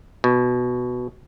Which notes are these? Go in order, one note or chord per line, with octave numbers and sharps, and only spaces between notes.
B2